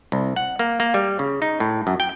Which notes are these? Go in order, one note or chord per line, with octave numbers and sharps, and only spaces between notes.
C2
F#5
A#3
A#3
G3
C#3
D#4
A2
F#2
G5